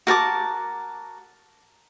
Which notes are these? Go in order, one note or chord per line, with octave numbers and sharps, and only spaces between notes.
F#4 A#4 A5 D6